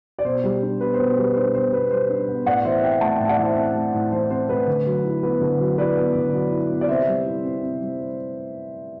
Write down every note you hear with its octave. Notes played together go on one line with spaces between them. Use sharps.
D5
B2 C5
G3
D4
B3 B4
C5
B2
C5
G3 B4
D4 C5
B3 C5
B2 B4
G3 C5
D4
B3
A2 D5 F#5
E3 C5 E5
C4 E5 G5
A3 F#5 A5
A2 E5 G5
D5 F#5
E3 C5 E5
C4
A3
A2
E3 C5
C4 C5
A3 B4
D3
F#3
E4
B3 B4
D3
F#3
E4 B4 D5
B3
D3
F#3
E4
B3
D5
C3 C5 E5
G3
E4
C4
C3
G3